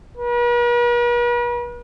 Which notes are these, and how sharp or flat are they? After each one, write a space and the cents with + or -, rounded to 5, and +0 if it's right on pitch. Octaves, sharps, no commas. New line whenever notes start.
B4 -45